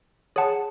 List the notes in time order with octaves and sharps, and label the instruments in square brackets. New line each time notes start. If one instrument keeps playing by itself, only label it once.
[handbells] G#4 C#5 F#5 A5